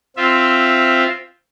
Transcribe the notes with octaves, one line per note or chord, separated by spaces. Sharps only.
C4 F4 E5